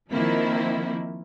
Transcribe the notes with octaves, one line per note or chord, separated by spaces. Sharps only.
D#3 F3 A#3 C4 E4